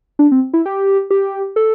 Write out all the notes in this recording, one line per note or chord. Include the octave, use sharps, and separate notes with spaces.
D4
C4
E4
G4
G4
A4